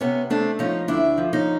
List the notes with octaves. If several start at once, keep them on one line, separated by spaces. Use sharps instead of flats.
C3 B3 C#4
A3 C4 D4
F3 C#4 D#4
D2 D4 E4
F3
C#4 D#4